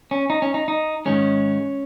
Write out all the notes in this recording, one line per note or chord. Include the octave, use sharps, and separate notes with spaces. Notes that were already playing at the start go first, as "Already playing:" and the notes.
C#4
D#4
C#4
D#4
D#4
G#2 D#3 G#3 C#4